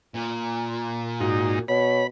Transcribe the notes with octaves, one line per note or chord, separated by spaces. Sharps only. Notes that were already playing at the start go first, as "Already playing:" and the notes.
A#2
G#2 D#4 F#4
B2 C#5 B5